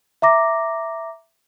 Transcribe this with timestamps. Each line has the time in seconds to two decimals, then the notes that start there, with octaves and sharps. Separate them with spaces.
0.22 E5 A#5 D6 A#6